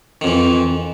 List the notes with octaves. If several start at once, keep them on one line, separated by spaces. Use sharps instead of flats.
F2 D#3 E3